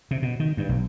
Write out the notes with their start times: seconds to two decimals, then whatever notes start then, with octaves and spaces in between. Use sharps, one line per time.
0.11 C3
0.22 B2
0.40 D#3
0.57 G2
0.69 B1